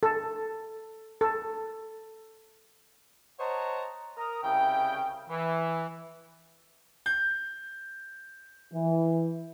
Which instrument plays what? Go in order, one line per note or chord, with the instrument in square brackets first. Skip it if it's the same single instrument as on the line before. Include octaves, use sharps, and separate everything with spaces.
[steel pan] A4
A4
[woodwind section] C5 C#5 D#5 F#5 A5 A#5
A#4 A#5 D#6
C2 C#3 E4 G5
E3
[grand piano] G6
[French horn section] E3